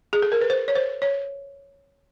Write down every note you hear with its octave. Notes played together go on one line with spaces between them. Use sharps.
G#4
A4
A#4
B4
C5
C#5
C5
C#5